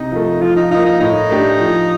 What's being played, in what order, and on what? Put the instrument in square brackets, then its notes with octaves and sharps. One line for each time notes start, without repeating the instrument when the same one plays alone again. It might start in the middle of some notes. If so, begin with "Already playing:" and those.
Already playing: [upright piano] C3 [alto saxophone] D#4
[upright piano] F3 A3
[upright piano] F3 [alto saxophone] F4
[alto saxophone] D#4
[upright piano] A#3 F4 [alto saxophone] D#4
[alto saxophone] D#4
[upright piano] A2 [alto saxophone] D#4
[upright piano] A3 D4 G4
F3